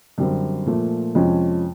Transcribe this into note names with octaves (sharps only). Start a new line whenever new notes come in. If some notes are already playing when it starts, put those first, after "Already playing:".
F#2 D3 G3 C4
A#2 F3 A3
F2 C3 F3 G#3 C#4